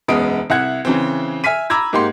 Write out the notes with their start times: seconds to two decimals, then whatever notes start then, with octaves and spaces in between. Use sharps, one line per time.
0.08 E1 F#2 G#3 B3 D#6 D7
0.50 C2 E5 F#5 F#6 G#6
0.85 C#3 E3 C4
1.44 E5 G#5 F6 B6 D#7
1.70 A#5 B5 D6 E6 G#6 A#6
1.93 G#2 A#3 G4 F#5 C6